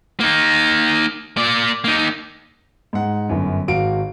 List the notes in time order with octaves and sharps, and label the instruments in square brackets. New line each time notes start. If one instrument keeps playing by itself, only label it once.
[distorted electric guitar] A#3 D#4
A#3 D5
A#3 D#4
[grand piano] G#2 F#5
G1 F#2
G#1 F#4 F5 D7